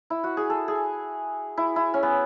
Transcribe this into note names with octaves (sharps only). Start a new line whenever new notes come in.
E4
F#4
G#4
A4
G#4
E4
E4
C#4
B3